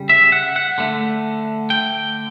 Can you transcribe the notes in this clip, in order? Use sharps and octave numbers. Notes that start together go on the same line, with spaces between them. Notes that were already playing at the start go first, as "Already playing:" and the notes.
Already playing: C#3 G3
E5
F#5
F#5
D3 A3
G5